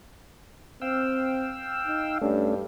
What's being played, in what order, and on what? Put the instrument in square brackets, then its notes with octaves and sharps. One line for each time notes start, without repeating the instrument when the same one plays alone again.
[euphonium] C4 [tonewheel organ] F5 G5 E6
[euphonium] D#4
[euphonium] G2 [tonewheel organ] A3 C#4 D4